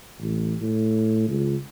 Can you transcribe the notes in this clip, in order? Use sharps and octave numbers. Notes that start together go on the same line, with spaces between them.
A1
A2
C#2